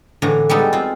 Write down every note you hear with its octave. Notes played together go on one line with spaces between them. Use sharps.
A2 D3 E3 A#5
G3 G#3 B3 D#4 A4
C4 F4